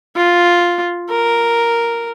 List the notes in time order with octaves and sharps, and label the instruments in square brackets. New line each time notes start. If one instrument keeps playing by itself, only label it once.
[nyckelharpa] F4
A#4